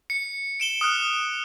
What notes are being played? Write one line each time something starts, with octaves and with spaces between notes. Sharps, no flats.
C#7
D7 E7 G7
D#6 F6 F#6